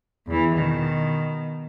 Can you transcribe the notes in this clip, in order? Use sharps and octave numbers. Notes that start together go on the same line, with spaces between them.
E2 E3
B2 D#3